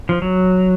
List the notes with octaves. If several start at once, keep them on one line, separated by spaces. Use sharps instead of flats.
F3
F#3